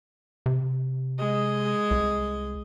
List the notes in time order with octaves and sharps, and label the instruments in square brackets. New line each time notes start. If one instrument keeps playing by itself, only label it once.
[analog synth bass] C3
[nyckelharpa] G#3 D#5
[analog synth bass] C2